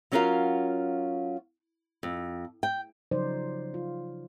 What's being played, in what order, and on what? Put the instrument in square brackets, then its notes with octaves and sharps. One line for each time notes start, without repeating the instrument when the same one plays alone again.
[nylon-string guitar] F#3 C#4 F4 F#4 A#4 F5
F2
G5
[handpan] C#3 F3 F#3 D#4 C5 D5
F4